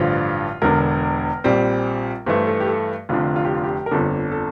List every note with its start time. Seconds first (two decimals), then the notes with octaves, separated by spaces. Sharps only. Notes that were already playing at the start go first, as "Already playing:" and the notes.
Already playing: A1 G2 D3 F3 F4
0.62 E1 E2 D3 A#4
1.44 A#1 A#2 G3 C4
2.26 G2 E3 A3 C5
2.47 A4
2.60 G4
2.67 A4
3.09 F1 F2 D3 F4
3.36 F4
3.45 G4
3.55 F4
3.64 G4
3.86 A#4
3.91 G1 F2 D3 A4
4.32 A4